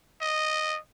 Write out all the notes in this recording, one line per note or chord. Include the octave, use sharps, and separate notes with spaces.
D#5